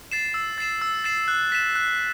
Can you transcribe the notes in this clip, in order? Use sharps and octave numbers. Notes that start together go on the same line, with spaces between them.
A6 C7 E7
E6
A6 C7 E7
E6
A6 C7 E7
F#6
B6 E7
F#6